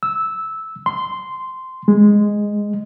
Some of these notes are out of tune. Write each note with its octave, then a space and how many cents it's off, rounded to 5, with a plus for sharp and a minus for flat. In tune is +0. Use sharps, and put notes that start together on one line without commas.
E6 -10
C6 -10
G#3 -5